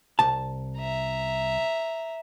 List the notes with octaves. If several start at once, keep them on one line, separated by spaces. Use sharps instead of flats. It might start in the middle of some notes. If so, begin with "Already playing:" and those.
C2 A5
E5 A#5